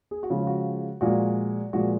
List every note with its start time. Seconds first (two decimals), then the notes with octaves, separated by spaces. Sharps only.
0.11 G#4
0.23 F#4
0.30 C#3 F3 G#3 F4
0.47 F#4
1.01 A#2 F3 G#3 F#4
1.73 A#2 F3 G#3 F#4